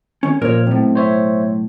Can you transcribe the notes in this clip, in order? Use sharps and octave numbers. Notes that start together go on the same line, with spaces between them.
D#3 C#4
A#2 F3 A#4 C#5
B1 A2 C4
C5 C#5 E5